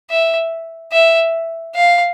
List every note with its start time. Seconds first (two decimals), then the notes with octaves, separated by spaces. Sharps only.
0.10 E5
0.92 E5
1.75 F5